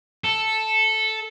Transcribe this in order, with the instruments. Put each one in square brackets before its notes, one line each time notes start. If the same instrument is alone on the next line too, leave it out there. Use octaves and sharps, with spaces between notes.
[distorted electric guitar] A4